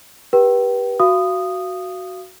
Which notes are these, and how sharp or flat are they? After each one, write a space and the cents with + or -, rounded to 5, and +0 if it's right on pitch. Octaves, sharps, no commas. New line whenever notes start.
G4 +0 B4 -30 G5 -25
F#4 +0 F5 -30 D#6 -10